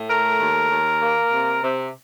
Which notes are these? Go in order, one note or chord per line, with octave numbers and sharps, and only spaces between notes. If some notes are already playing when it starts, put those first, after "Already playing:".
Already playing: A2
A3 A#4
D#2
D#2
A#3
C3
C3